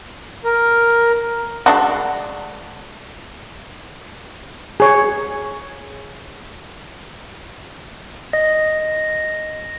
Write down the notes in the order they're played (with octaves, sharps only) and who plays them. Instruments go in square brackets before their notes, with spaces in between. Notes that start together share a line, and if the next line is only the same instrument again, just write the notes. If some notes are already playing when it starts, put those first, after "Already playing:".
[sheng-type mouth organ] A#4
[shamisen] G#3 D4 F#4
[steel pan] G#4 C#5
[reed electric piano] D#5 [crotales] A#6